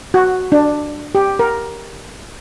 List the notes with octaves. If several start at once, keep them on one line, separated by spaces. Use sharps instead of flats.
F#4
D4
G4
A#4